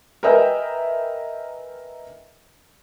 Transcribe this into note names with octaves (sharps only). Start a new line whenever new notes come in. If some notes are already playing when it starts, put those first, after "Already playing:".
A#4 B4 D#5 E5 G5 G#5